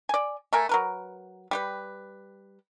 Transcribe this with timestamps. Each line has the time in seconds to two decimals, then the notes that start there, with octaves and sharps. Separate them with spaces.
0.09 D5 G#5
0.53 A3 A#4 G#5
0.69 F#3 A#4 B4
1.51 G3 G4 B4